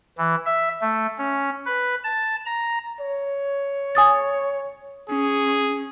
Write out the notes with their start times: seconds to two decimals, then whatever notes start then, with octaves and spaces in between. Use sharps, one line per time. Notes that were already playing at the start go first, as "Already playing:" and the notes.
0.18 E3
0.46 E5
0.81 A3
1.18 C#4
1.66 B4
2.04 A5
2.46 A#5
3.00 C#5
3.95 G#5 D#6 A6
5.10 C#4 G#4